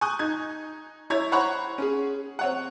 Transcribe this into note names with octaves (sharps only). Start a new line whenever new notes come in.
G#5 C#6 D#6 F#6 G6
D#4 G#6
E4 C#5 G#6
C5 C#5 F#5 A#5 B5 C#6
C#4 G#4
C4 C#5 F#5